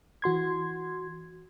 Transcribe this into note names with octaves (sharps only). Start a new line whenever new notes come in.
E3 F#4 C6 G#6